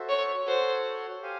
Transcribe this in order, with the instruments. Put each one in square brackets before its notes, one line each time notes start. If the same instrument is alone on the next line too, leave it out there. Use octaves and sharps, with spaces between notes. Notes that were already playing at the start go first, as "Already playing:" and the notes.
Already playing: [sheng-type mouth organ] F#4 A4 C5 E5
[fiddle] C#5
[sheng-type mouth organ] F#4 A4 C#5 F#5 [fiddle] C5
[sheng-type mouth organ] G4 C5 F5 G#5